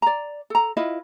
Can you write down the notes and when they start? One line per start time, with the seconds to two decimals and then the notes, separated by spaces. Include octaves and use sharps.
0.02 D5 A#5
0.50 A4 A#5
0.77 E4 F4 B4 D#5